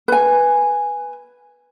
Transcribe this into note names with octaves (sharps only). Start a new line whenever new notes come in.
B4 G#5